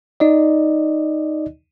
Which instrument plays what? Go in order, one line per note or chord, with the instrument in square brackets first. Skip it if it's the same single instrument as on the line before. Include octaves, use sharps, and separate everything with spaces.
[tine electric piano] D#4 D5 D#5